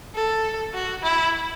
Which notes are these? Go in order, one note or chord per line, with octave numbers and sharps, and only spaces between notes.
A4
F#4
E4